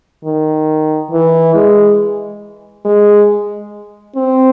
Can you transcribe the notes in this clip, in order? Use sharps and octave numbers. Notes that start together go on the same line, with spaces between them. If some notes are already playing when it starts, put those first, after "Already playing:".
D#3
E3
G#3
G#3
C4